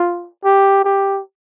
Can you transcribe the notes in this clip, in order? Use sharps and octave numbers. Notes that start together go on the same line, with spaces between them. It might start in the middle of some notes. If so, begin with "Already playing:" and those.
Already playing: F4
G4
G4